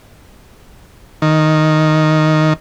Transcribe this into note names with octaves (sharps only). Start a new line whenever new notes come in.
D#3